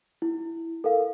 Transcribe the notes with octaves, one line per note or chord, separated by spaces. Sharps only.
E4
A4 A#4 F5